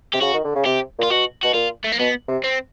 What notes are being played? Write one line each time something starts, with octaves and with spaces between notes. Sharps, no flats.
C3 G4
C#3 F#4
D#3
D3
C#3
C3 G4
A#2 F4
B2 F#4
B2 F#4
A#2 F4
A3
A#3
B2 B3
C3
C4